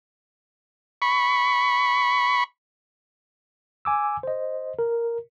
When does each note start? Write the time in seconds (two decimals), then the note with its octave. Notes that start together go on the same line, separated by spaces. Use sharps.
1.02 B5 C#6
3.85 G#5 D6 E6
4.23 C5 D#5
4.79 A#4